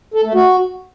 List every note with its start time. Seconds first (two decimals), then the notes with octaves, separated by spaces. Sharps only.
0.14 A4
0.24 A3
0.34 F#4